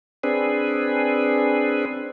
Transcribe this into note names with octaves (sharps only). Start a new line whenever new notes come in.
C4 D4 G#4 B4